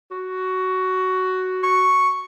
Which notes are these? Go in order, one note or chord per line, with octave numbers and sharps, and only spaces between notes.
F#4
C#6